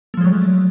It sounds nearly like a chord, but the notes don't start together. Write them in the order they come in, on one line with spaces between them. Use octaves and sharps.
A3 F3 G#3 F#3